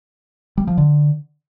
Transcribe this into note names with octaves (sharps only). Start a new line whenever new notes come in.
G3
F3
D3